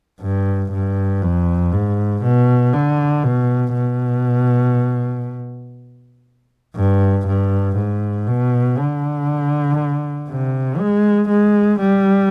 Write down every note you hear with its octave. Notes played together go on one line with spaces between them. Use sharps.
G2
G2
F2
G#2
B2
D3
B2
B2
G2
G2
G#2
B2
D3
C3
G#3
G#3
G3